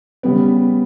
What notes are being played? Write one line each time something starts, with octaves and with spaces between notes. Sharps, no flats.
C#3 G3 B3